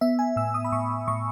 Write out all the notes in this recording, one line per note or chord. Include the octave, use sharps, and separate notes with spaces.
B3 E5
G#5
A2 E6
D#6
B5
A2 C#6
A2 C#6